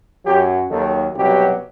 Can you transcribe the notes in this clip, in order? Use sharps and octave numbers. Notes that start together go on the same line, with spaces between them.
F#2 F#3 G4
D#2 D#3 F#3 A4
C2 B2 F#3 G4